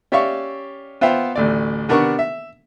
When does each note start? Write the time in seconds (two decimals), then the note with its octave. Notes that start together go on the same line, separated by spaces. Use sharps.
0.12 C#4 G4 D5 E5 F5 C#6
1.01 B3 F4 C5 E5 F5 G5
1.36 A1 D2 D5
1.89 C3 B3 D4 A#4 F#5 C#6
2.19 E5